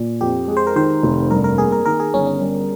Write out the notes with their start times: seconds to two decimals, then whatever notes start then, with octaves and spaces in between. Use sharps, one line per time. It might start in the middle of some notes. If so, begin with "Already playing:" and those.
Already playing: A#2
0.21 F2 G4
0.48 G#3
0.57 C5
0.67 A#4
0.76 D#3 C5
1.03 F1
1.31 G2 A#4
1.44 A#4
1.58 A#3 G#4
1.72 A#4
1.86 D#3 A#4
2.00 G#4
2.14 G1 C#4
2.27 C#4
2.41 G3